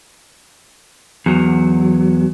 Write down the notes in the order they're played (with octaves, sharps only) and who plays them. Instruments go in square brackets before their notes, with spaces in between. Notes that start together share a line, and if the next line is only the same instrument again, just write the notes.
[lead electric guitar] E2 F#3